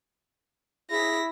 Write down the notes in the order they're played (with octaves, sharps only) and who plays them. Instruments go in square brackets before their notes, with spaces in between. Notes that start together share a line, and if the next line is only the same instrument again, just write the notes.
[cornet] E4 [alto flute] G#4 [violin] A#6 B6